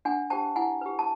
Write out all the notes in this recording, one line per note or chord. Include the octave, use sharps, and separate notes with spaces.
D4 F#5 G#5
G4 C5 G5 A5
E4 F#5 G#5
G4 B4
A5